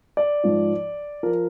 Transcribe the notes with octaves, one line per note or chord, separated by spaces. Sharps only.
D5
G#2 F3
F3 A#4